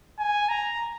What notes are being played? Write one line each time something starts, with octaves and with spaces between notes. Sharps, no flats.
G#5
A#5